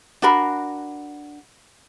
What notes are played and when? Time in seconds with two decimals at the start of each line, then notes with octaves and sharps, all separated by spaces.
0.22 D4 F#4 A#4 B5